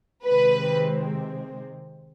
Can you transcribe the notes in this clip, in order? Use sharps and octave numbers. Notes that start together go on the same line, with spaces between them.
C3 D#3 G#3 C4 B4